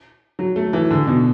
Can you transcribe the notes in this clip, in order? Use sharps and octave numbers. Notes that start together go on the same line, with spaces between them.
F#3
A3
E3
D3
B2